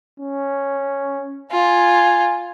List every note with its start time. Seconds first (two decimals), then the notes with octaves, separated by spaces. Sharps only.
0.20 C#4
1.51 F4 G#5